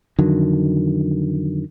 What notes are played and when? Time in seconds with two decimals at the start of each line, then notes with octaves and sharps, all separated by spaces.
0.18 F2 D3 D#3 F#3